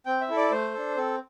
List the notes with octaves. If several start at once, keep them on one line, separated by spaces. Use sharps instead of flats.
C4 G5
E5
E4 A4
D5
A3 C5
D4 A4
C4 A4